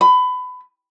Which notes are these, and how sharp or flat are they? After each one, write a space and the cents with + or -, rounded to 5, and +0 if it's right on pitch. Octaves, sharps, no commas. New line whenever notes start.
B5 +25